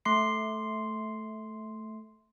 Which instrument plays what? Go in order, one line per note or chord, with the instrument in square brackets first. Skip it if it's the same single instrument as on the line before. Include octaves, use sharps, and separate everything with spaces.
[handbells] A3 C6 C7